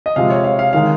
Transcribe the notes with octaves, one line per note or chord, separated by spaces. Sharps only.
D#5
C3 F3 G#3 F5
C#5
F5
F5
D#3 G#3 F5